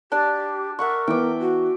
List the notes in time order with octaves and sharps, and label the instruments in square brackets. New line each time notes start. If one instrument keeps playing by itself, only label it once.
[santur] D4 D5 A5 [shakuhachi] G4
[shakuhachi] A#4 [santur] E5 F#5 C#6
[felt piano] E3 B3 [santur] G5 D6
[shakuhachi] F#4